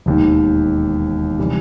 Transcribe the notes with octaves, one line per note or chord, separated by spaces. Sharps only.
E1 D#2 D#3
C3 E3 G3